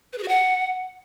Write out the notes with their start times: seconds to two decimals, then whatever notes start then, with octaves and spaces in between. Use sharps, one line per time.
0.13 B4
0.18 G#4
0.23 F#4
0.28 F#5